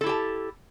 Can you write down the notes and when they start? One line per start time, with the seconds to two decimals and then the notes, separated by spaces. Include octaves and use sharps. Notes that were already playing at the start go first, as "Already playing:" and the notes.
0.01 A4
0.04 E4
0.06 G4
0.09 A5